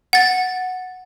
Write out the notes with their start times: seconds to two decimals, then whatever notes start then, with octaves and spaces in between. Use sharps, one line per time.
0.13 F#5 A6